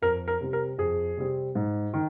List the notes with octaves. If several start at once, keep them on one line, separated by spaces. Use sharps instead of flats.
F2 A#4
A#4
C3 G3 C4
A#4
F2 G#4
C3 G3 C4
G#2
D#3